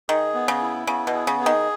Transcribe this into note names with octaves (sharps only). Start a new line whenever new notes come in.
D#3 G#4
B3
C#3
E4
C#3 B3
B2
G#4
C#3
G#4
D#3